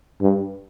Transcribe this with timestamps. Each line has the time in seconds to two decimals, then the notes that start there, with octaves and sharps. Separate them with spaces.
0.22 G2